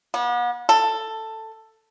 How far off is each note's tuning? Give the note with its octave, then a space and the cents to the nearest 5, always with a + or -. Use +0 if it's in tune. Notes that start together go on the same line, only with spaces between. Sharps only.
B3 -40
A4 +10